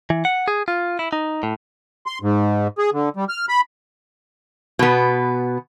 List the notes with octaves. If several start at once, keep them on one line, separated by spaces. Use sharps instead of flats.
E3
F#5
G#4
F4
E4
D#4
A2
C6
G#2
G#4
D3
G3
F6
B5
B2 B3